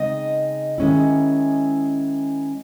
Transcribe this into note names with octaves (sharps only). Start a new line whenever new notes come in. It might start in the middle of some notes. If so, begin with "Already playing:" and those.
Already playing: C#3 G#3 C4 D#4 D#5
D#3 G#3 C#4 E4